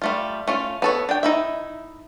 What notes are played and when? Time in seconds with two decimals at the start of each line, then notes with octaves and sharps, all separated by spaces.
0.02 G3 A3 F4
0.48 A3 C#4 F4
0.82 B3 A4 C#5
1.09 D4 G5
1.23 D#4 E4 E5